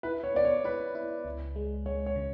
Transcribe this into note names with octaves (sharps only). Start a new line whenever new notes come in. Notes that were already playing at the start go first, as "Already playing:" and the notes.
E4 B4
C#5
B3 D5
C#5
E4 B4
E4
C#2
G#3
G#3 C#5
C#5
C#3